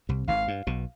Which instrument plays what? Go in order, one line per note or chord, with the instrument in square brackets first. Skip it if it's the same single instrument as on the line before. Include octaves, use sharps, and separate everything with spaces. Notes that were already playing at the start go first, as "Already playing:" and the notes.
[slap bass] C2 C3
[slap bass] G#1 G#2 [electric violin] F5
[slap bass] G2
B1 B2